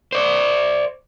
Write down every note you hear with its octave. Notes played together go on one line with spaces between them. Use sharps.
C5 D5